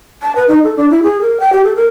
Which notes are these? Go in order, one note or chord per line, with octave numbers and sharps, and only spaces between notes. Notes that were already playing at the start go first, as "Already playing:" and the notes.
A5
B4
D#4
A4
D4
E4
G#4
A#4
G5
G4
A4
A#4